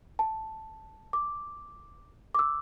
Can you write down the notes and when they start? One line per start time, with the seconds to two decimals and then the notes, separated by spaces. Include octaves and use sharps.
0.19 A5
1.13 D6
2.35 D6
2.39 E6